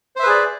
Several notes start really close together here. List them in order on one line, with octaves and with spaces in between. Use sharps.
C5 E5 B4 G#4 D5